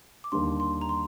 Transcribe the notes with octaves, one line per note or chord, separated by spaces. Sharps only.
D6
D#2 D3 G3 D4 C6
C6
A#5
C6